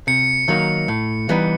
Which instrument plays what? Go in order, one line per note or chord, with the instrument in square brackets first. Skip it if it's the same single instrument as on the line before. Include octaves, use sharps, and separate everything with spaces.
[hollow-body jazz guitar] C3 [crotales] C#7
[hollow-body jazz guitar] D#3 F#3 A#3 D#4
A2
E3 G3 B3 D#4